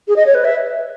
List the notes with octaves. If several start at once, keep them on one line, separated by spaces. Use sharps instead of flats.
G#4
D#5
C#5
B4
E5